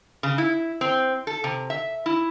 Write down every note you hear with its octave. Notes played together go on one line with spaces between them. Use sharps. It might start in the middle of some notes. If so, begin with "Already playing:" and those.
C#3
E4
C4
A4
C3
E5
E4